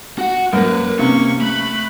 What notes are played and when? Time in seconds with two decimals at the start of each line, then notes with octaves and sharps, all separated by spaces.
0.18 F#4 F#5
0.53 F#2 A#3 A#4 B4
0.99 C3 A#3 C#4 C#6
1.41 A3 B5 F#6